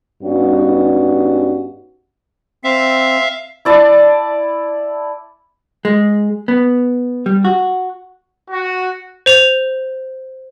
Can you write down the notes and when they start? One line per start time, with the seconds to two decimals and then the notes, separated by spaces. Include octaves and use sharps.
0.23 G2 G3 B3 C#4 D#4 F#4
2.64 C4 E5 F5
3.65 E4 D5 A5
5.85 G#3
6.48 B3
7.26 G3
7.45 F#4
8.49 F#4
9.26 C5 F7